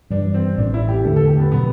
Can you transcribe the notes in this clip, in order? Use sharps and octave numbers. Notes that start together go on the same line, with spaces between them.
G2 E3 G3 D4
C4
A1 A2 E3 D4
E4
G4
E2 D3 A3 D4 A4
A4
G4
B3
B2 F#3 B3